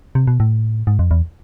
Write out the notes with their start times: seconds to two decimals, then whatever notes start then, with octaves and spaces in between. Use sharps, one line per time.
0.15 C3
0.27 B2
0.40 A2
0.87 G#2
0.99 F2
1.11 E2